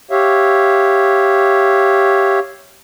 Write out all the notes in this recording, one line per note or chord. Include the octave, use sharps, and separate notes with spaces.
G4 C#5 E5 F5